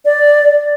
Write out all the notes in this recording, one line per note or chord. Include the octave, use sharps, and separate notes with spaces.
D5